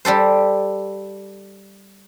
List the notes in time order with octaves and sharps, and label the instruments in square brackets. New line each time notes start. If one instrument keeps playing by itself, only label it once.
[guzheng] G3 G4 A4 C5